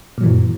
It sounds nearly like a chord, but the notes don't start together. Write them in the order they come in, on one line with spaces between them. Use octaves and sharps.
A#2 F#3 E3 F#2